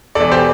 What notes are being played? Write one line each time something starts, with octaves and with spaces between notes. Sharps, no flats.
E1 E2 E3 A4 D5
G4 C5